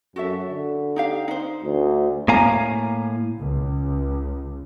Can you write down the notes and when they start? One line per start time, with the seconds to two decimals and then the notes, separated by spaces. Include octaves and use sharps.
0.16 F#2 F#4 A4 E5
0.49 D3
0.96 D#4 G4 F5
1.28 D#4 C5
1.63 D2
2.28 A2 A#3 F5 G#5 A#5
3.39 C#2